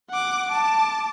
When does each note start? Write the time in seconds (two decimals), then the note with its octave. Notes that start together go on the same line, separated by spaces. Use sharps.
0.10 F#5 D6
0.49 A5 D6